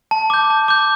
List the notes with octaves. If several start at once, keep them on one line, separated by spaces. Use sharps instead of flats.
A5
D6 G6
A5
D6 G6